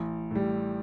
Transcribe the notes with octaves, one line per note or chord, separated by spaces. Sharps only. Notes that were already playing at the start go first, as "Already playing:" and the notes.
Already playing: A1
A2 G3